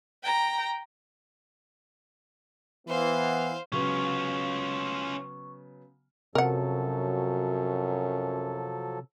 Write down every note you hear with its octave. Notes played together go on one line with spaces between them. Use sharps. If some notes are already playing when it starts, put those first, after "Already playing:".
G5 A#5
E3 B3 C5 F5
C#3 F#3 B3 C#4 F4 C#6
F#2 C3 F3 F#3 A4 A#4 F#5